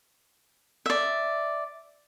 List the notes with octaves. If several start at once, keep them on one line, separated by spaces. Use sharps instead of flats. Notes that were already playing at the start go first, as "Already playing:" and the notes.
D5 E5